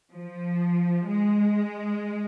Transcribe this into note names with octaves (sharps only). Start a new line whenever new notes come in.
F3
G#3